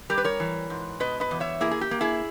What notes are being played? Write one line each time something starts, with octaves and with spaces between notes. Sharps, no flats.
G3 G4 A#4
B4
A#4 C#5
E3
G#2
B2 B4 D#5
B4 D#5
E2
C#5 E5
A#3 E4 G#4
G#4
G4
A#3
E4 G#4